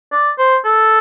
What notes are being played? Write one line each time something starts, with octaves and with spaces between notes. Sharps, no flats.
D5
C5
A4